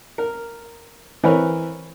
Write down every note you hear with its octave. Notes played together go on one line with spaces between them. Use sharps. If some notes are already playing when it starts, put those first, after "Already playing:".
A#4
E3 C4 A#4 B4 C#5